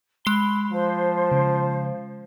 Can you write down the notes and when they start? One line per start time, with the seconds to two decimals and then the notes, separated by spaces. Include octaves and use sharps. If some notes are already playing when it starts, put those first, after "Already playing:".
0.25 G#3 B5 C7 G7
0.71 F3 C5
1.32 C#3